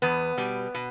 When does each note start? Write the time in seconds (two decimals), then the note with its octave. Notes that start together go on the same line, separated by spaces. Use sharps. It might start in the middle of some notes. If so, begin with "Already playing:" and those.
0.02 E2 B3
0.38 B2 G3
0.75 B2